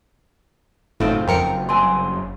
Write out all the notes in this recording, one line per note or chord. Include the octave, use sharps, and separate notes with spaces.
F#1 A2 C4 D#4 F4 A4
F2 A#4 G5 C#7
G2 C4 G#5 C6